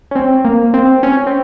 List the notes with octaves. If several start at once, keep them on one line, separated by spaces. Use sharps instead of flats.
C#4
C4
A#3
C4
C#4
C4